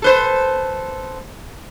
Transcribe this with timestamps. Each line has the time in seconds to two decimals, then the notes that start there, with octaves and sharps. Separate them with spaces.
0.02 A4 B4 C5